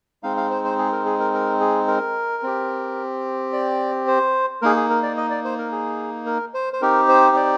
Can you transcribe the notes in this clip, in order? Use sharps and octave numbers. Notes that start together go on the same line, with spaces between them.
G#3 C4 D#4 F5
F5
C5
C5
G#4
A#4
G#4
A#4
A#4
G#4
A#4
C4 G4
D5
C5
A#3 D#4 G#4 A#4
G#4
A#4
D5
D#5
D5
C5
A#4
G#4
A#4
C5
C5
C4 D#4 G4 A#4
C5
D5